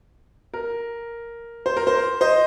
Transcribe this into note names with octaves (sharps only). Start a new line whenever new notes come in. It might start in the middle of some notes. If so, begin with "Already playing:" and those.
A#4
C5
A#4
C5
C5 D#5